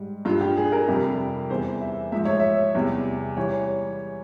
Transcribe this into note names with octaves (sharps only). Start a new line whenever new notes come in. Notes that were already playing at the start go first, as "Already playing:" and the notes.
Already playing: G#2 G3
G2 G3 F4
G4
G#4
A#4
F2 C3 G3
E2 E3 G3 C5
E5
G#2 F3 E5
C#5
E5
E2 C3 G3
E3 G3 C#5